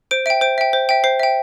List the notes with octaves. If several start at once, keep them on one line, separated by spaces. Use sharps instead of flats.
C5 D7
E5 G5 D7
C5 D7
E5 G5
C5
E5 G5
C5 C7
E5 G5